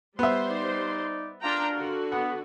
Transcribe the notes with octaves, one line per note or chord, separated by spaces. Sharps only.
G3 B3 C5 E5 C6
D#4 D5
D4 F4 A#4 G5 A#5
D3 F#4
B3 F#5